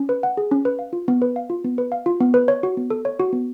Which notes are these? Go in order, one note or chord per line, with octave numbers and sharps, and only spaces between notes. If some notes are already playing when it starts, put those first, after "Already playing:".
Already playing: C#4
B4
F#5
G#4
C#4
B4
F5
F4
B3
B4
F5
F4
B3
B4
F5
F4
B3
B4
C#5
F#4
B3
A4
C#5
F#4
B3